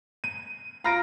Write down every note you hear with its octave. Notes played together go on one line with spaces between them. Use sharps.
D#7
F4 A#5 B5 F6 A#6 D7